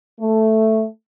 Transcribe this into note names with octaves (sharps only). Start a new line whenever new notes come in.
A3